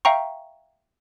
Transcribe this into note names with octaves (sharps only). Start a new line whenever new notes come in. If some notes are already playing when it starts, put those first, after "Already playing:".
E5 F5 G5 A#5 C#6